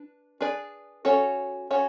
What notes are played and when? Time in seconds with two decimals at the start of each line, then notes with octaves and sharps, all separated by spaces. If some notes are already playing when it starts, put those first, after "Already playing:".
Already playing: D4 B4
0.41 D4 G#4 B4 D5
1.05 C#4 F#4 A4 C#5
1.71 C#4 F#4 A4 C#5